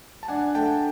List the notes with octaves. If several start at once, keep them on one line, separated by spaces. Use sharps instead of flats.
A5
D4 F#5 G#5
A3 G5 A5